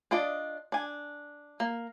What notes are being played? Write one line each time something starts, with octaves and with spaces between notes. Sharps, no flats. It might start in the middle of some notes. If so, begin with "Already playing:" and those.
D4 F4 D5 D#5
D4 G#5
A#3